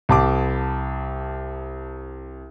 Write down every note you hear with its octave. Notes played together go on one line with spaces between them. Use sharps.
C2 A5 D6